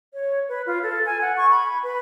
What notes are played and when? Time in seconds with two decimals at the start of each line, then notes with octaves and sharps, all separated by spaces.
0.14 C#5
0.49 B4
0.67 F4
0.83 A4
1.06 G#5
1.21 F#5
1.37 C#6
1.51 B5
1.83 B4